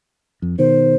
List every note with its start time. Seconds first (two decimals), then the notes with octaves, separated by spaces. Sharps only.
0.42 F2
0.59 B2 D#3 C5